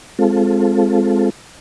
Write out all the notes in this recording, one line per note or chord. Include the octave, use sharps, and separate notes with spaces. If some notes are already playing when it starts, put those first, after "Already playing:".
G#3 C4 F4 A4